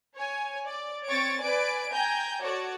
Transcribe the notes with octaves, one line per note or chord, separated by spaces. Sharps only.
C#5 G#5
D5
C4 C#5 C#6 A6 D7
B4 D5 G#5 D7
G5 G#5 A#5 G6
F#4 A4 C#5 D5